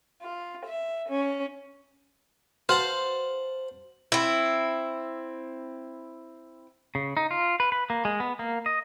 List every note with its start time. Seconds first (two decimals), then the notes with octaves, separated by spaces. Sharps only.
0.24 F4
0.66 E5
1.09 C#4
2.69 F#4 B4 C5 F5 F#5 A5
4.12 C4 E4
6.95 C#3
7.17 D#4
7.31 F4
7.60 B4
7.72 B4
7.90 A#3
8.05 G#3
8.20 B3
8.39 A#3
8.66 D#5